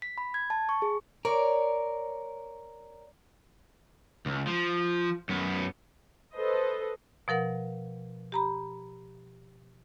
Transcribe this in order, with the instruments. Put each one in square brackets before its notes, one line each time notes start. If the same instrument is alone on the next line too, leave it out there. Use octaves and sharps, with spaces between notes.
[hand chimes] B6
B5
G#6
A5
C#6
G#4
[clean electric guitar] A#4 [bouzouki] C#5 D5
[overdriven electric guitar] C#2
F3
F#2 B3
[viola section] A4 B4 C5 D#5
[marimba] B2 F3 A#4 F#5
G4 A#5 B5